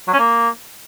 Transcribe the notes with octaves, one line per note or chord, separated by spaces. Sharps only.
F#3
C#4
A#3